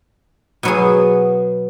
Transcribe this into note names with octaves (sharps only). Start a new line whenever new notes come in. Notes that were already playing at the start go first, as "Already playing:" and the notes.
B2 F#3 B3 G#4 C#5